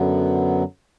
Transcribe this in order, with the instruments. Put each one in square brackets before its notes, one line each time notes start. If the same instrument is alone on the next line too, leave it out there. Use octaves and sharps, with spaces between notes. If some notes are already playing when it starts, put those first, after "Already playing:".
Already playing: [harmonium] F#2 D3 F#3 B3